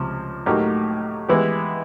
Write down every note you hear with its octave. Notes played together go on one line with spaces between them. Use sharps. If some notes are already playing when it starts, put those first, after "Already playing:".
Already playing: C#2 C3 F3
A2 F#3 A#3 D#4 G4
E3 G#3 B3 E4 G4